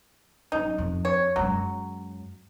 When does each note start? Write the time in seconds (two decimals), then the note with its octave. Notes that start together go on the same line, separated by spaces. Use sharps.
0.52 F#3 C#4 D#4
0.78 F2
1.05 C#5
1.36 F#2 F#3 G#3